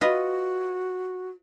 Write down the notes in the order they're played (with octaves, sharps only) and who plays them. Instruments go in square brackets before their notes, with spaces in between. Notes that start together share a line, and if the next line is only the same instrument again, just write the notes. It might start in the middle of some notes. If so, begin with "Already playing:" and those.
[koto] F4 B4 D#5 [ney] F#4